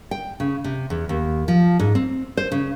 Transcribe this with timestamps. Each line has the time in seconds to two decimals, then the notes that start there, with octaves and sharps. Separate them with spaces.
0.11 G5
0.40 C#3
0.64 C3
0.90 E2
1.09 D#2
1.48 F3
1.79 G#2
1.95 C4
2.37 C5
2.52 C#3